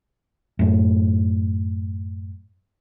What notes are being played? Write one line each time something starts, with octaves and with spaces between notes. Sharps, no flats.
F#2 A2